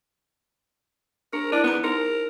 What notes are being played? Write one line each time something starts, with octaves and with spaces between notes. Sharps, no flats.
D4 A#4
D4 E4
B3 D#4 A#5
D#4 A#4